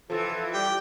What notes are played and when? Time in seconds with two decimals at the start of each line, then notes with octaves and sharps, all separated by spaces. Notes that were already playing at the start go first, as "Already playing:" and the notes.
0.10 F2 D3 E3 F3 F4 A4
0.54 G3 G4 G5